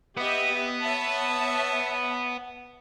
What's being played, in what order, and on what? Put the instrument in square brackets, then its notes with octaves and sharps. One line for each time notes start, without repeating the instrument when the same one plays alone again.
[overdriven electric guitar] B3 [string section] G4 D#5 E5
[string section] C#5 E5 A5